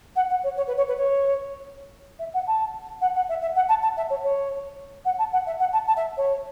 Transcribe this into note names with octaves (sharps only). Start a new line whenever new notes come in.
F#5
F#5
C#5
C#5
B4
C#5
B4
C#5
E5
F#5
A5
F#5
F#5
E5
E5
F#5
A5
A5
E5
C#5
C#5
F#5
A5
F#5
E5
F#5
A5
A5
E5
C#5